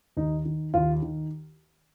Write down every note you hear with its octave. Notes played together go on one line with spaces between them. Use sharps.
D#2 D#4
D#3
D#2 F4
D#3